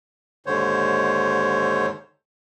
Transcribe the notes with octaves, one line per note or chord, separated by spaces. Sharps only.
D#2 G#2 D3 C5 C#5